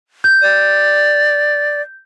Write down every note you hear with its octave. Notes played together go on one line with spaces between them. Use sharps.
G6
D5